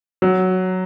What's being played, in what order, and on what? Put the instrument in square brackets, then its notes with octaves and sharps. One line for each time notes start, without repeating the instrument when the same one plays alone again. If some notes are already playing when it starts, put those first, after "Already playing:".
[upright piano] F#3